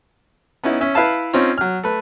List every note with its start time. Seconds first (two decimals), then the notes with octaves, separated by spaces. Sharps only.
0.64 B3 C#4 D#4 E4
0.81 C#4 E5
0.95 E4 B4 E5 F5 A5
1.33 C4 C#4 D#4 F4 C#5
1.58 F#3 F6
1.83 A3 B4